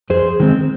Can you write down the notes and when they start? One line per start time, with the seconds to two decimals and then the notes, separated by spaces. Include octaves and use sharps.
0.10 F2 G#4 C5
0.40 D#3 G#3 C4